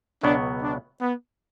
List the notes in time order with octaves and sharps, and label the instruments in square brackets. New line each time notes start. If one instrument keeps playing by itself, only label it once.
[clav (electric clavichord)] C#2 B2 F#3 B3 [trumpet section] D4
[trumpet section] D4
B3